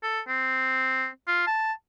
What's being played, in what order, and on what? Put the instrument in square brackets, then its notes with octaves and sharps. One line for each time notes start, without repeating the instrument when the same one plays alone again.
[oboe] A4
C4
F4
A5